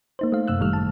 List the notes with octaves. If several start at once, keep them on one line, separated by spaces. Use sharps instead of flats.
A#3 D#4 C5
A3 F5
F#2 C3 E6 F#6
G1 A2 D#3 G3 A3 F6
A5